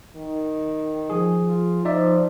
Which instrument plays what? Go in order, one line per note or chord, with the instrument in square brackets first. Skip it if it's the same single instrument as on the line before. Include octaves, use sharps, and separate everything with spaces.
[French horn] D#3
[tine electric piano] F3 G#4
[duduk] F4
[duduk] F3 [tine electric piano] D#4 D5 E5